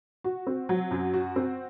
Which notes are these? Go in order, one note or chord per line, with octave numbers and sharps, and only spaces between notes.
F#4
C4
F#3
F#2
F#4
C4